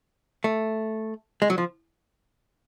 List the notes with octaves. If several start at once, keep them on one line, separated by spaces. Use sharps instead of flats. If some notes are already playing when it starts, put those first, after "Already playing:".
A3
G#3
F#3
F3